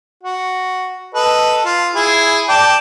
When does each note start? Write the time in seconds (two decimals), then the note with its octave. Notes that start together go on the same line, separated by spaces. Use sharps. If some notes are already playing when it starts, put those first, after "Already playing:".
0.23 F#4
1.15 A4 B4 D#5
1.65 F4
1.96 E4 G#4
2.49 D5 G5 A5